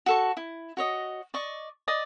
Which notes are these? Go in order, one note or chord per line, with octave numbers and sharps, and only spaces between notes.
F#4 A4 C#6
E4
F#4 C#5 D#5
D5 D#5 C#6
D5 D#5 D#6